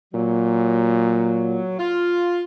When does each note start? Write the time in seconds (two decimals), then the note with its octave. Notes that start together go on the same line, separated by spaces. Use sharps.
0.14 A#2 F#3
1.79 F4